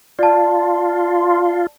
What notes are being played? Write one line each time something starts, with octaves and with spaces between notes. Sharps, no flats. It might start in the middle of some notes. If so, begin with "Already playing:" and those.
F4 D5 A5